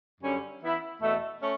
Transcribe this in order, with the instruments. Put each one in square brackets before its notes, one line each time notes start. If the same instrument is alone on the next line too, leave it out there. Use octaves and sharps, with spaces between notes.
[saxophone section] F#2 D3 G3 C#4
E3 B3 E4 B4
E2 B2 A3
A3 C#4